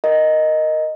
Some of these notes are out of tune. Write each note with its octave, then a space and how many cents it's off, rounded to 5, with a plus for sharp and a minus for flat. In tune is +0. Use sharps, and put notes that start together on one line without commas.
A#4 +0 D#5 +0